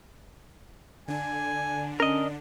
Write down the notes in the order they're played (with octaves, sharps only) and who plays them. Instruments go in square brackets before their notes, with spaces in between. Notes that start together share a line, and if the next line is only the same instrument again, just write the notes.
[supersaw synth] D3 D4 [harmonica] G#5
[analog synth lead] C#4 [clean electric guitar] A#4 D#5